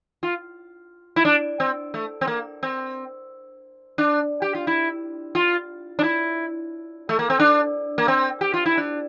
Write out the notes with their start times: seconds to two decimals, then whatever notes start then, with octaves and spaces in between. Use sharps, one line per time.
0.23 F4
1.16 E4
1.25 D4
1.60 C4
1.94 A3
2.21 C4
2.27 A#3
2.63 C4
3.98 D4
4.42 G4
4.55 F4
4.67 E4
5.35 F4
5.99 D4
6.03 E4
7.09 A3
7.19 A#3
7.30 C4
7.40 D4
7.98 A#3
8.08 C4
8.41 G4
8.54 F4
8.66 E4
8.77 D4